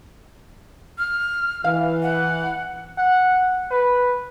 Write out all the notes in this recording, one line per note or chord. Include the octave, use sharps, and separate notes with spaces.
F6
E3 F5
F#5
F#5
B4